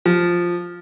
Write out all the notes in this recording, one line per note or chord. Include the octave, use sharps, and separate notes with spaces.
F3